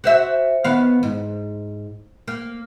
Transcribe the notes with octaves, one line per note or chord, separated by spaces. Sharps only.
F#4 C5 E5
D#3 B3 F5
G#2
A#3